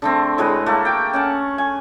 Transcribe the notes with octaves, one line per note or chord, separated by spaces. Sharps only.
D3 A3 C4
A2 G#3 F#4 B4
A3 A#3 F#4
G5 D6
C#4 F#5 A5
G#5